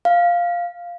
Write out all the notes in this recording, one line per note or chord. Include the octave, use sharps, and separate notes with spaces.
F5